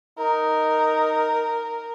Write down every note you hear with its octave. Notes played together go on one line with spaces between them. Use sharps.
D#4 A#4